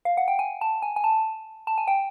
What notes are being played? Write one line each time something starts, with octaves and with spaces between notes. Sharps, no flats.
F5
F#5
G5
G#5
A5
G#5
G#5
A5
A5
G#5
G5